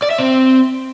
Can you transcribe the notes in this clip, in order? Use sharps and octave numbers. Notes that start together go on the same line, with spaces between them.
D5
E5
C4